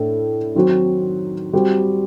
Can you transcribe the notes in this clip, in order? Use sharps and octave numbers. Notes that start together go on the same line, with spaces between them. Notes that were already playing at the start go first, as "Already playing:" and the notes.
Already playing: A2 A3 D4 A4
D#3 F#3 C4 D#4 F#4
G3 C4 F#4